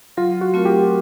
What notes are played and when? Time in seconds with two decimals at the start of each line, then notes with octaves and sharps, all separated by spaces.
0.17 F#3 F4
0.41 F#4
0.54 A3 C4 F4 A#4
0.65 G4